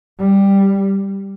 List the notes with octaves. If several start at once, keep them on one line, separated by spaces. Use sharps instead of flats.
G3